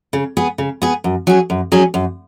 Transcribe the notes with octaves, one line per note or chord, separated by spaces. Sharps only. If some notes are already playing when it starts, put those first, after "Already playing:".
C#3
B3 G#4
C#3
B3 G#4
F#2
F#3 C#4 G#4
F#2
F#3 C#4 G#4
F#2